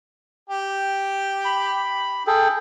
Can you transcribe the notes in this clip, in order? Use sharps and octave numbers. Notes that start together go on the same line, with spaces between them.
G4
B5
G#4 A4 G5